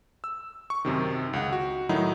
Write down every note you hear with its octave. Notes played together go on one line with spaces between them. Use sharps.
E6
C#6
F#2 C3 D#3
C#2 F#5
F#4
A2 D#3 F#3 D#4 E4